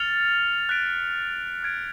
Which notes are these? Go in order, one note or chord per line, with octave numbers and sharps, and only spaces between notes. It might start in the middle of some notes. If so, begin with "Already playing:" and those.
Already playing: F6 A6 C#7 F7
F#6 B6 D7
F6 G#6 D7